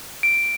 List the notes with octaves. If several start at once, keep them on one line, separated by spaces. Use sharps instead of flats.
D7